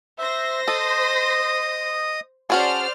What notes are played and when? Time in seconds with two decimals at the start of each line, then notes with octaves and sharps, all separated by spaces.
0.18 C5 E5 A#6
0.68 A4 D#5 D#6
2.50 C#4 F#4 G#4 C5 D5 A5 F6